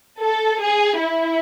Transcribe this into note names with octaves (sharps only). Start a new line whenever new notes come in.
A4
G#4
E4